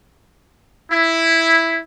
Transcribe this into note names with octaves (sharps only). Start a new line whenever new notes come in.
E4